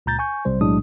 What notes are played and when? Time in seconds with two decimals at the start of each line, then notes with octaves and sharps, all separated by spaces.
0.06 C#2 A#2 A#5 G6 A6
0.19 G#5 C#6 G6
0.45 B1 C3 G3 C5
0.61 B1 A2 F#3 G#3 D4 D#6